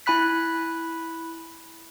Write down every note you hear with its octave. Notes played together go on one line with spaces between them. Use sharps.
E4 G#5 B5 F#6 B6